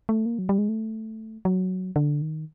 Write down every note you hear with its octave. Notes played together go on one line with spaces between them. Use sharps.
A3
A#3
F#3
G3
G#3
A3
F#3
D3
D#3